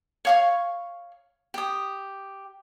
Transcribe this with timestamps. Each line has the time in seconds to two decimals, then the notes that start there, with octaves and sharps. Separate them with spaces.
0.25 C#5 F5 C#6
1.54 G4 D#6